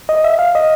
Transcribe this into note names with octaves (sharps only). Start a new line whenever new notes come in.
D#5
E5
F5
D#5